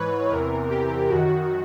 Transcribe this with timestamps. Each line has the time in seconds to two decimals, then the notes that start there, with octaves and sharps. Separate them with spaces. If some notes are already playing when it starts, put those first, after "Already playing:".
Already playing: G#2 E3 B4 C#5
0.29 E2 C3 E3 A#4
0.69 G4
1.09 F#2 D#3 F#4